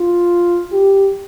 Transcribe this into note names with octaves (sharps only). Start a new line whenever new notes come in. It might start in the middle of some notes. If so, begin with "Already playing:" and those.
Already playing: F4
G4